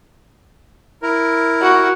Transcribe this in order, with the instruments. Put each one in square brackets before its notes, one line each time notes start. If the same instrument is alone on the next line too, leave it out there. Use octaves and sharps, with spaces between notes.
[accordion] E4 A#4
[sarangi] F#4